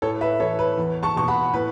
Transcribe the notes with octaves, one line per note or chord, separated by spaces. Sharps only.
A2 A4 C#5
B4 E5
E3 A4 C#5
B4
E2
A5 C#6
B2 C#6
F#5 B5
A2 B4